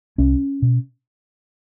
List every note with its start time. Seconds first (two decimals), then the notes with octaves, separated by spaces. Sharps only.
0.18 C2 C#4
0.62 B2